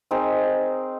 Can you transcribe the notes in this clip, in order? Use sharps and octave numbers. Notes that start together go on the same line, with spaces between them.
C4 D#4 G#4 A#4